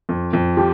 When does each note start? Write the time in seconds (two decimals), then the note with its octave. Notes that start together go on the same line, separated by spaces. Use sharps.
0.09 F2
0.33 F2
0.57 F3 G4